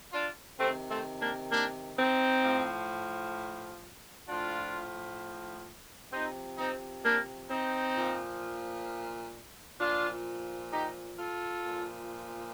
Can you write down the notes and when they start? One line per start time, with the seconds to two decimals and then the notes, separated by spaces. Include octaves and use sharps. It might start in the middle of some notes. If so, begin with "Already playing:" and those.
0.13 D4 F4
0.59 C3 D#3 A3 C4
0.90 A3 C4
1.21 A#3 D4
1.51 A#3 D4
1.98 C4 D#4
2.44 A2 F3
4.27 A2 F3 D4 F4
6.12 C3 F3 C4 D#4
6.57 C4 D#4
7.04 A#3 D4
7.49 C4 D#4
7.96 A#2 F3
9.80 A#2 F3 D4 F4
10.72 D#4 G4
11.18 F4 A4
11.64 A#2 F3